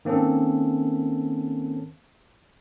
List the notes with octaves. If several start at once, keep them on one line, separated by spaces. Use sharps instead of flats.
D#3 A#3 C4 C#4 A4